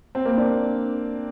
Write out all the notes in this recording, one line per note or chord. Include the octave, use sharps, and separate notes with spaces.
C4
A#3
D4